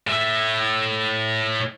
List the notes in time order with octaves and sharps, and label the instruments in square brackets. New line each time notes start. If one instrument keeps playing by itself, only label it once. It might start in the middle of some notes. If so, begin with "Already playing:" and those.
[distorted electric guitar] A2 E5